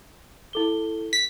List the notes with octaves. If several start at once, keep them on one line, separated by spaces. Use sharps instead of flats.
E4 A4 G7
B6